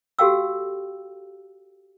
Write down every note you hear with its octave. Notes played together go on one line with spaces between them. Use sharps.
F#4 G4 A4 F5 G5 E6